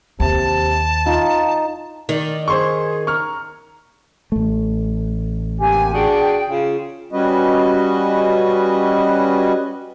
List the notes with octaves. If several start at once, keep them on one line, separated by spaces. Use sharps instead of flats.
D#2 C3 A5
D#4 F4
D#3 D5
G#4 C5 C6 C#6
A#5 C#6 F6
A1 A3
C3 A#3 G4 G#5
D4 F#4 G#4 G5
C#3 C#4 F4
G3 C#4 F#4 B4 D#5